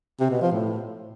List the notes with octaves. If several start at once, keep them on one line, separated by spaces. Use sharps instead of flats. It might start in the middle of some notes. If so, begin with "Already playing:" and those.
C3
B2
F3
A2